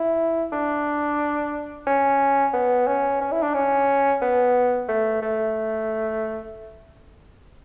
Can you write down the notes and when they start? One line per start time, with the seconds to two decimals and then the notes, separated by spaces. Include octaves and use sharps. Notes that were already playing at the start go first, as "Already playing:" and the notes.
Already playing: E4
0.52 D4
1.87 C#4
2.54 B3
2.87 C#4
3.21 C#4
3.32 E4
3.43 D4
3.54 C#4
4.22 B3
4.89 A3
5.22 A3